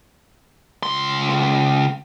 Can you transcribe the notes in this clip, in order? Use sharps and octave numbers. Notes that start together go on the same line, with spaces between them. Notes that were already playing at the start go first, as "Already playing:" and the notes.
C#2 C6